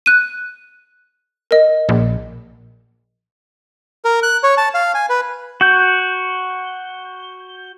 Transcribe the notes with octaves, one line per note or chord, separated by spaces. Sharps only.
F#6 D#7
A#4 D#5
A#1
A#4
F#6
C#5
A5
F5
G#5
B4
F#4 G6